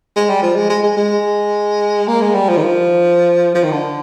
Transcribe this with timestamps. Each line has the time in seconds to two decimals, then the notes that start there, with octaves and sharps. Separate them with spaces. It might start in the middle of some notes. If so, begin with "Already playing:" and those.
0.16 G#3
0.29 G3
0.42 F3
0.56 G#3
0.70 G#3
0.83 G#3
0.97 G#3
2.08 A#3
2.22 G#3
2.34 G3
2.49 F3
2.57 D#3
2.63 F3
3.55 F3
3.64 D#3
3.72 D3